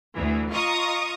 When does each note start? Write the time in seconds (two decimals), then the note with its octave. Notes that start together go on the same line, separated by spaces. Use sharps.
0.15 D2 E3
0.51 F4 D#5 F5 A#5 C#6 D#6